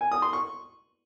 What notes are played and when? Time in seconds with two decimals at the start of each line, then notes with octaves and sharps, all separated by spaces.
0.01 G#5
0.12 D#6
0.22 C6
0.33 C#6